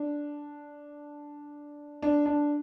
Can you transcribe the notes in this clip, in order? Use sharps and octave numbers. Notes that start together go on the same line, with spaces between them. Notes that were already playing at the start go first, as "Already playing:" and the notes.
Already playing: D4
D4
D4